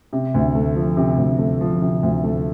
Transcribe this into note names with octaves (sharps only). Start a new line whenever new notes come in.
C3
D2
A3
F3
C3
D2
A3
F3
C3
D2
A3